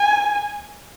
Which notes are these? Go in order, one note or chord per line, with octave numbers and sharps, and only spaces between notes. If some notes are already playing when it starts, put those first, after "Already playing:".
Already playing: G#5